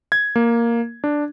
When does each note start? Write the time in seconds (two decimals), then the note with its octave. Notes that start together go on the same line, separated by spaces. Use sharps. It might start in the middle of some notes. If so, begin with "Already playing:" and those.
0.12 G#6
0.36 A#3
1.04 D4